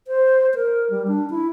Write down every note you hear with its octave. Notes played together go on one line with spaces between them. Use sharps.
C5
A#4
G3
D4
E4